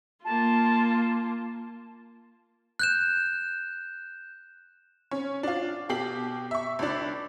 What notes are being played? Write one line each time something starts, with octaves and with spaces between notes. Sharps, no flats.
A#3 F4 A5
F#6 G6 E7
C#4
D4 F4
B2 G4 C7 F#7
E5 C#6
C#2 D4